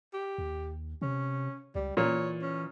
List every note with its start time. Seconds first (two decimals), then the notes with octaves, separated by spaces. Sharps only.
0.13 G4
0.38 D#2
1.02 C3 C#4
1.75 C#2 G3
1.97 A#2 E3 C#5
2.42 C#4